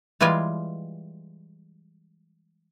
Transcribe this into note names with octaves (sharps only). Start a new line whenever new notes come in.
E3 G3 G#3 F4 G#5